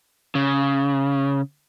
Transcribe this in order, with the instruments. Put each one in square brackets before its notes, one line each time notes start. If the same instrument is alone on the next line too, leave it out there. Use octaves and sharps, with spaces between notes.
[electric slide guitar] C#3